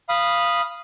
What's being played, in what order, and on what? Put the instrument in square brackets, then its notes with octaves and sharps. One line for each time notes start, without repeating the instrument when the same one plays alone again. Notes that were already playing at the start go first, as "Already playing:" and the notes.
[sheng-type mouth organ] F5 B5 D#6